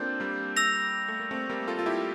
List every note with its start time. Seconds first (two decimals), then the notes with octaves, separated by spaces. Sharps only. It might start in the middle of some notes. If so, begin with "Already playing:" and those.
Already playing: A#3 C4 D4 F4 A4 G6
0.20 G3 A#3
0.56 E6 A#6 F7
1.08 A3
1.20 A#3
1.31 A3 C4
1.50 G3 A#3
1.68 F4 A4
1.79 F4
1.86 E4 G4